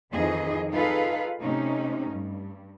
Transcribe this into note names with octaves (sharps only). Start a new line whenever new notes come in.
F2 D#3 E3 D#4 G#4 D#5
D#4 F4 G#4 A4 B4 F5
C3 A3 C#4 D#4
G2